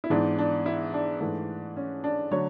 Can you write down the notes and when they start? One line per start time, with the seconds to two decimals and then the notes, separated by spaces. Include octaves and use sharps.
0.04 E4
0.10 G#2 E3 B3 D4
0.39 D4
0.66 E4
0.94 D4
1.20 G#2 E3 A3
1.77 C#4
2.04 D4
2.31 D3 F#3 A3 C#5